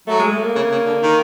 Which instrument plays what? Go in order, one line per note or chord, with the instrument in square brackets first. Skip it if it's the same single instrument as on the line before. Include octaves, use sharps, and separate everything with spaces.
[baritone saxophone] F#3 [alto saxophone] A3
[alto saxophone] G#3
A3
A#3
[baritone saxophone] C#3
C#3
D3
D#3